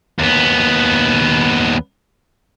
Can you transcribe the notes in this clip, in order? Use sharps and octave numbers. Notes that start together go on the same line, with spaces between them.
D#2 B3